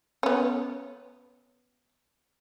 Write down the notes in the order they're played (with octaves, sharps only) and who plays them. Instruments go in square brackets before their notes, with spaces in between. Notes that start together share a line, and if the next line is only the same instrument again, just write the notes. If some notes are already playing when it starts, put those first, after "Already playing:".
[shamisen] B3 C#4